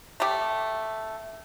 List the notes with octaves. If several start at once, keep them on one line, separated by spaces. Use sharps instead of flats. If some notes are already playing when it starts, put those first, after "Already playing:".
A3 G4